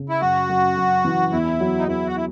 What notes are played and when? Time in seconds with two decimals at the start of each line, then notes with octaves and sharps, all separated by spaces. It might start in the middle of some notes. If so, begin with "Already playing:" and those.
Already playing: C#3
0.09 E4
0.21 F#2 F#4
0.49 F#2
0.77 F#2
1.05 E3
1.32 E2 E4
1.60 F#3
1.79 D#4
1.87 E2 E4
2.07 F#4
2.16 E4